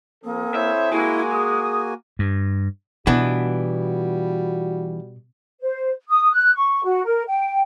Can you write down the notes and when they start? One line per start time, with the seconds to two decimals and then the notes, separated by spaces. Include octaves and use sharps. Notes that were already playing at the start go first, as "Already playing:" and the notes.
0.24 F3 A#3 C4 A4 D#6
0.55 E4 C5 C#5 E5
0.92 G#3 A#3 E4 F#4 G#5
1.31 G#4 D#6
2.19 G2
3.07 B2 E3 G3 B3 D4 F4 F#4
5.60 C5
6.09 D#6
6.32 F#6
6.55 C#6
6.83 F#4
7.04 A#4
7.26 G5